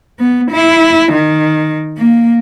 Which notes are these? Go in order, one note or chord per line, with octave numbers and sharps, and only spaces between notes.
B3
E4
D#3
A#3